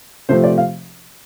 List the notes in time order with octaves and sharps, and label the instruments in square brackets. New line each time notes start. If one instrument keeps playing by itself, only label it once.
[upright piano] C3 F3 A3 C4 C5
D5
F5